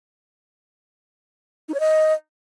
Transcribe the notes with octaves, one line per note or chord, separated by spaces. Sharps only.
D#4
C#5
D#5